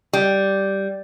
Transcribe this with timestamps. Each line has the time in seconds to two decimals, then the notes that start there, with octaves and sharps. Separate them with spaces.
0.13 G3